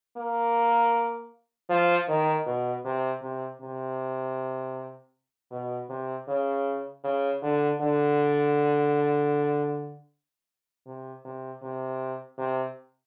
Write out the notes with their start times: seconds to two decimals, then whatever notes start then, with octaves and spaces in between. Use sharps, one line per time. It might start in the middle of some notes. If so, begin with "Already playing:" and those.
0.17 A#3
1.70 F3
2.09 D#3
2.46 B2
2.85 C3
3.22 C3
3.61 C3
5.51 B2
5.89 C3
6.28 C#3
7.04 C#3
7.43 D3
7.81 D3
10.86 C3
11.25 C3
11.62 C3
12.38 C3